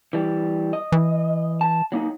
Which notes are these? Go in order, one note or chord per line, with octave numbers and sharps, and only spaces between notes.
E3 G3
D#5
E3
A5
F#3 A#3 D#4